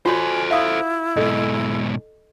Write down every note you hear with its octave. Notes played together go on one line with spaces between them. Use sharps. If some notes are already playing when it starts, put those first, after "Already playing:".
F4 F#4 A4 C5 C#5 G#5
E4 E5 F5 D#6
G#2 B2 A4 D#5